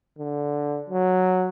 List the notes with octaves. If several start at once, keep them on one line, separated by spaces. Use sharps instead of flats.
D3
F#3